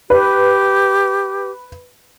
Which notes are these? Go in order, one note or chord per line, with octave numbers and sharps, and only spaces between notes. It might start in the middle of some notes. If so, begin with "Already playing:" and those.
G4 B4